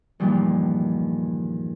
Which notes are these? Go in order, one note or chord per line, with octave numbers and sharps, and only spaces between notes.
E2 G2 A#2 D#3 F3